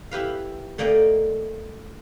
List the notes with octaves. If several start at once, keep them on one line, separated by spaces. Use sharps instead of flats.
E4 G4 B4 F5
A3 A#3 D5 D#5 G5